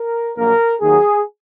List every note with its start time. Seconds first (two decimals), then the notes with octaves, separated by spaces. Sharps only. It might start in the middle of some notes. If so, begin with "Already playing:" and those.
Already playing: A#4
0.37 A#1 A#2 F#3 A#3 A#4
0.81 D#2 D#3 F#3 G#4